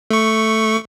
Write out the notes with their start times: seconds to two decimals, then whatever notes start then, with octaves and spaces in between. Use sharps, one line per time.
0.10 A3 C#6